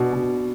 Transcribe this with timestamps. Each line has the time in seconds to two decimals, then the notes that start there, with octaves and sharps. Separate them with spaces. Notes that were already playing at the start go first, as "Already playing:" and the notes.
Already playing: B2 D4
0.13 B2